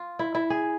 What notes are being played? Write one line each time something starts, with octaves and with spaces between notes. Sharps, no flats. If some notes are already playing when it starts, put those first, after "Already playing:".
Already playing: F4
E4
E4
G#4